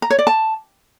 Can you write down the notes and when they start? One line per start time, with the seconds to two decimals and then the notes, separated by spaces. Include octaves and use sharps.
0.02 A#5
0.10 C#5
0.19 D5
0.27 A5